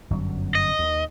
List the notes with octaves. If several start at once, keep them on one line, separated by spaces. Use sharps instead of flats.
G1 F#2 F#3
D#5
D#2